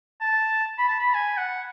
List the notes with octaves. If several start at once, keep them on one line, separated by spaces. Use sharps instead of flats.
A5
B5
A5
B5
G#5
F#5